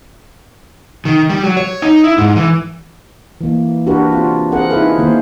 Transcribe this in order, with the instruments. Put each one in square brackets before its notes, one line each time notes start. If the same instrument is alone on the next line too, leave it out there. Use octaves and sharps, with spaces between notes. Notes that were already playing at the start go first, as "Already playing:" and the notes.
[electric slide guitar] D#3
G3
F#3
C#5
D#4
E4
G#2
E3
[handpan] E3 A#3
D4 F#4 G4 A#4 B4
C4 F4 F#4
C4 G#4 A#4 F#5
D#4 E4 G#4 A#4 B4 F5
D#3 A#3 C5